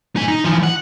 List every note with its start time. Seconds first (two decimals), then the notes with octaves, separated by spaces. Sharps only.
0.16 D#4 G#5
0.28 D#4
0.44 E3 F3
0.63 F#5